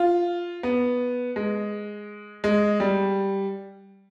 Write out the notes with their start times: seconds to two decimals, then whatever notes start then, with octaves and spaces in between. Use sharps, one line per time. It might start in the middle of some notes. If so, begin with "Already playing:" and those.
Already playing: F4
0.63 B3
1.36 G#3
2.44 G#3
2.80 G3